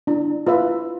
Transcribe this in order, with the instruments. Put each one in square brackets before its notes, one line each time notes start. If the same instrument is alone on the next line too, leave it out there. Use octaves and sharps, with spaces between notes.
[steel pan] D4 [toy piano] E4
[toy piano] E4 [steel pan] F4 B4 E5